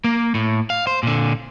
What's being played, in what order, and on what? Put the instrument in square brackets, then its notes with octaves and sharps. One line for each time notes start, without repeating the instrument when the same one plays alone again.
[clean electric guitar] A#3
A2
F5
C5
A#2 D3